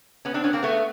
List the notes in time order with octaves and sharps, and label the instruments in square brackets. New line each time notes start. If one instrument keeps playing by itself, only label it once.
[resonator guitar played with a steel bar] B3 C#4
C4 D4
B3 C#4
A#3 C4
A3 B3